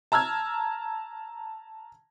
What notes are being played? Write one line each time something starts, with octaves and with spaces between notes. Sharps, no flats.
A5 A#5 E6 F6 G#6